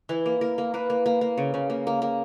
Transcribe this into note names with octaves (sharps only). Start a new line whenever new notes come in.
E3 E4
A#3
A#3 A#4
A#3
A#3 B4
A#3
A#3
A#3
C#3
C#3
A#3
A#3
A#3